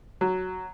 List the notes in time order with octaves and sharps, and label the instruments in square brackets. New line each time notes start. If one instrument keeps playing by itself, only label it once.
[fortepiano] F#3